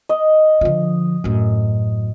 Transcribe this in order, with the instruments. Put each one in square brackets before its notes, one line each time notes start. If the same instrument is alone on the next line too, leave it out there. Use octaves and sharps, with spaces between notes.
[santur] D#5
[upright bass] D3 F3
F#2 A2